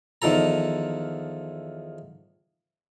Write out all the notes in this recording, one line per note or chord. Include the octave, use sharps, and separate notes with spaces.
E2 D#3 F3 A4 A#5